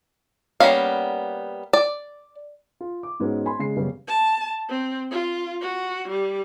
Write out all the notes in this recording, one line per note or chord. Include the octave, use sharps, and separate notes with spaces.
G3 A#3 B3 C#4 F5
D5
F4
D6
G#2 G#3 B3 C#4 F#4
G#5 B5 C6
C#3 G#3 C7
F#2 C#3 G3 B3 C#4
A5
C4
F4
F#4
G3